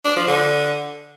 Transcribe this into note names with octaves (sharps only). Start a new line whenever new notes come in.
D4
F3
D3